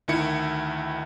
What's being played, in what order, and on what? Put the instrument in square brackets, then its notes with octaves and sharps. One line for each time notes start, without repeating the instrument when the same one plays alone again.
[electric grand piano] D2 D#3 E4 C#7